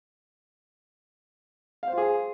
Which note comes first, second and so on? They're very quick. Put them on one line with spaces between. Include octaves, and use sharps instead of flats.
F5 C5 F4 G#4 G#5